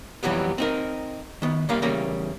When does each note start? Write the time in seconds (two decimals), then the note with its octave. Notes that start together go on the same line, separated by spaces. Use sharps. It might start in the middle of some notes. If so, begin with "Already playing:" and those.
0.23 F2 E3 F#3 G3 B3
0.58 C4 D#4 A#4
1.42 D#3 B3
1.69 C2 G3 A#3 A#4 F5
1.82 E2 C#3 G3 A#3 A#5